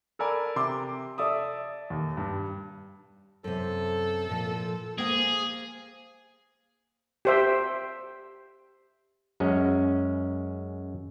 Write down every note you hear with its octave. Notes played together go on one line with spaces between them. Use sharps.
A4 A#4 D5 G#5 B5
C3 C6 D6
A4 D5 E5 D#6
D#2
G2
F#2 C3 A4
A#2 F3
A#3 G#4 C5 G5
G4 C5 E5
F#2 G#3 C#4